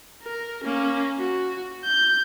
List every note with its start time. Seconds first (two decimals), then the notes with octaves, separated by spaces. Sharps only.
0.23 A#4
0.64 A#3 C#4
1.19 F#4
1.84 G6